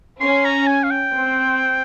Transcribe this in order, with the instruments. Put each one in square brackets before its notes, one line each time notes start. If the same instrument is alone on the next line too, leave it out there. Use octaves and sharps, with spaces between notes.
[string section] C#4 [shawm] C6
[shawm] A#5
G#5
F5
G5
[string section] C4